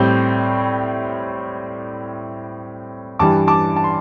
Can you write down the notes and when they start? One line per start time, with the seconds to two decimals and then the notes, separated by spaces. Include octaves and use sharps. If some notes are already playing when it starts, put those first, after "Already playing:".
Already playing: A2 G3 C4 G6
3.19 G2 E3 G3 A5 D6
3.48 A5 D6
3.76 A5
3.84 C6